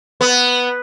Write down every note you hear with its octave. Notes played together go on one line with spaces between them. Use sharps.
B3